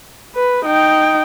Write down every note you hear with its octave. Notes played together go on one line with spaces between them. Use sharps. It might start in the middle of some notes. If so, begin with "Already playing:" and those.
B4
D#4 G5